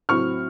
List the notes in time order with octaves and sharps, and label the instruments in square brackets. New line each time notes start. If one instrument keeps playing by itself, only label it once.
[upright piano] A2 F#3 C4 C#6 F6